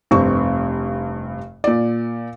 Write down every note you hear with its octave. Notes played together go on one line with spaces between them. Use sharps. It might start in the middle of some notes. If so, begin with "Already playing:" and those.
F1 G2 C4 C#6
A#2 D5